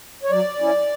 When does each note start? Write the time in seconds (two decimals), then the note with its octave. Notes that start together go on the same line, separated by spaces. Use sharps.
0.23 C#5
0.30 F#3 D5
0.60 C#4 E4